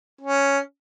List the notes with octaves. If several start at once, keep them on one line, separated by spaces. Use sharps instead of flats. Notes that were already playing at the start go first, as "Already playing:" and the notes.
C#4